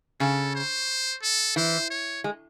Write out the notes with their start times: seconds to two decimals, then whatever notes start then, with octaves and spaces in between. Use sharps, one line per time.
0.20 C#3 A4
0.55 C5
1.23 A4
1.56 E3 C5
1.90 C#5
2.24 G#3